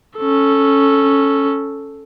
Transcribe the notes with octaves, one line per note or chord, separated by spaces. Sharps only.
C#4 A4